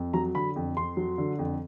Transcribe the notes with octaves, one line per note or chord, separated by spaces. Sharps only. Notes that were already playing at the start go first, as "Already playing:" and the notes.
Already playing: F2
F#3 A#5
D3 B5
F2
F2 C6
F#3
D3
F2